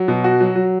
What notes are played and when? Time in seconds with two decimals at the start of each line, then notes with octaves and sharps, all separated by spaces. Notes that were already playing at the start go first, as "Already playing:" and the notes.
Already playing: F#3
0.08 B2
0.24 F#4
0.40 F#3
0.55 F#3